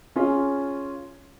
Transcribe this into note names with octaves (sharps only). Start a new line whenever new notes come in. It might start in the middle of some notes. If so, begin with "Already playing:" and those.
C#4 F4 G#4